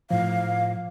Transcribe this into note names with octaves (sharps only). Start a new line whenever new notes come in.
A2 F3 F5